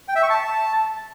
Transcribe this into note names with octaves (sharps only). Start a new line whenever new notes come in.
G5
E5
C#6
A5